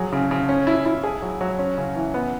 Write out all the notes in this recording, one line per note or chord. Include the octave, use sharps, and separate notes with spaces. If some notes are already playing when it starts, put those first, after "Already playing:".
Already playing: F#3 G#4
C#3
C#3
C#4
E4
E4
G#4
F#3
F#3
C#4
C#3
E3
B3